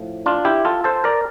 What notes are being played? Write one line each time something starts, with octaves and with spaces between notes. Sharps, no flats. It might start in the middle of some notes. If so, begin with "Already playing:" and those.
Already playing: A2 F3
D4 F4
E4 G4
F4 A4
A4 C5
A#4 D5